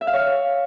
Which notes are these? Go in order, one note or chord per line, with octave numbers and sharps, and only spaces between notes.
E5
F5
C#5